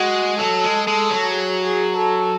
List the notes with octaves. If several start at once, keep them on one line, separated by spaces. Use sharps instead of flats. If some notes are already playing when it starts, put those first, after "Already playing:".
Already playing: G#3 F#4
F#3 A4
G#3
G#3 A4
F#3
G#4
G#4
A4